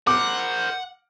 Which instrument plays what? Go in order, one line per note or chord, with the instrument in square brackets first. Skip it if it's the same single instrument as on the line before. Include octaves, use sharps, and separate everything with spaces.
[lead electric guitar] A#4 C5 [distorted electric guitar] F#5 [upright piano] D6